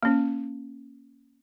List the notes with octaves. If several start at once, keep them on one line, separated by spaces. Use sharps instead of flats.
A#3 C#4